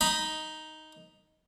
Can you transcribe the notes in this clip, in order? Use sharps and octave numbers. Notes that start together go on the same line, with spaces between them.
D#4 B5 D#6